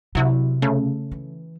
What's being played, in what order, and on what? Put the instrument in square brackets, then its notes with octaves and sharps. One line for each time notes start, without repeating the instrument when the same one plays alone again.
[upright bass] C3 [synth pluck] F#3 E4 F#4
[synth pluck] C#3 A3
[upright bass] E3